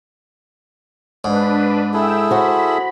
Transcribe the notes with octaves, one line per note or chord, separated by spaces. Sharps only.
G#2 D4 B4
E4 G#4 A4 E5 G5 E6
F#4 C5 B5